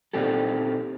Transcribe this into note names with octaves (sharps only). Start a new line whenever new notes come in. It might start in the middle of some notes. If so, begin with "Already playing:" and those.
A#2 C4 D#4 G4 A4